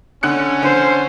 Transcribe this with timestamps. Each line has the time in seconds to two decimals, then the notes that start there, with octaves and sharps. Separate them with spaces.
0.23 D3 C#4 F#6 C#7
0.62 D3 C5